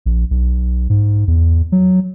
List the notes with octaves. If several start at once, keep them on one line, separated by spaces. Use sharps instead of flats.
A#1
B1
G#2
E2
F#3